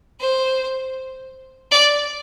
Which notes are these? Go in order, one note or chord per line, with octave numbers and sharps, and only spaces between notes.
C5
D5